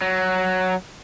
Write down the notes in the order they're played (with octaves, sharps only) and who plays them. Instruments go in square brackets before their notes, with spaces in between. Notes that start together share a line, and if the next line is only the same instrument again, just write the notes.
[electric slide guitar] F#3